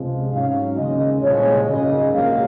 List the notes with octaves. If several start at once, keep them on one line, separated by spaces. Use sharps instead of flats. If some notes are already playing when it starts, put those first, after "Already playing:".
Already playing: C#2 C3 F3 G#3
G#2 F#3 C#4 F5
D#2 C#3 G#3 D#5
C2 A#2 F3 G#3 C#5
G#1 F#2 C#3 D#5
A#1 G#2 F#3 A#3 F5